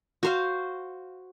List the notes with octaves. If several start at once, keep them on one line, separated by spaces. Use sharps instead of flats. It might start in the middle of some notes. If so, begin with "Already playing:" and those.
F#4 C5 F5